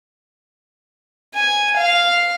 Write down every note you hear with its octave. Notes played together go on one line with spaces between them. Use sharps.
G#5
F5